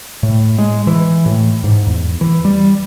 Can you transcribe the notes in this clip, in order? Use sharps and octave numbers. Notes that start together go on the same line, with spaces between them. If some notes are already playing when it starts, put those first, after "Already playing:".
A2
G#3
E3
A2
G#2
E2
E3
G3